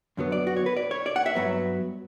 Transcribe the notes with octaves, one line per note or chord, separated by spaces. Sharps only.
F#2 D3 F#3 B3
D5
F#4
C#5
B4
D5
C#5
D5
F#5
E5
G2 F#3 B3